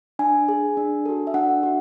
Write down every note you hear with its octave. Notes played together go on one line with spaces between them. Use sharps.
D4 G#5
G#4
D4
F#4 A4
E5
D4 F#5
F#4